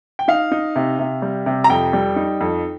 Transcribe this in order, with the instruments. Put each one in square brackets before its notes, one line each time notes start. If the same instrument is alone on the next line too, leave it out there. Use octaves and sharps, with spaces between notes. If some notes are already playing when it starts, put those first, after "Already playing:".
[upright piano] G5
D#4 F5
D#4
C3
C3
G3
C3
A#5
F2 G5
G3
D#4
F2